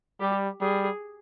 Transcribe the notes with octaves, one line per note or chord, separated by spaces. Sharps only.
G3 G4
G3 G#4